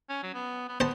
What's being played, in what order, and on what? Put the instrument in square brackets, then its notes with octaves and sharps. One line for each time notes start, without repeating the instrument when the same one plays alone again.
[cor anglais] C#4
F#3
B3
B3
[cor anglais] B3 [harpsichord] C5 A5